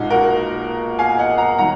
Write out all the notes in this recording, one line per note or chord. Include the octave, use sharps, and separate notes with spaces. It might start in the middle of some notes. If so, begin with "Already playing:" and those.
Already playing: B1 A#2 G#3 D#4 F4 F#4
F#4 A#4
F5 G#5
D#5 F#5
F#5 A#5
D#3 F#3 F#5 A#5